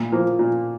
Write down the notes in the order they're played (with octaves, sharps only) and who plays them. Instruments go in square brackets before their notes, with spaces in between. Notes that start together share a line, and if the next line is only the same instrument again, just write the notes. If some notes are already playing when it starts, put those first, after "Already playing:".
Already playing: [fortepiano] A#2
F3 A#3
A#2